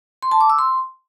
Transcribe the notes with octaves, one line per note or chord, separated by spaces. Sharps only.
C6
A5
D6
E6
C6